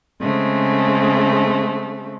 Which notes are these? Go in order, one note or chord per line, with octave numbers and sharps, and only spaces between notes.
C#3 G#3 A3 C4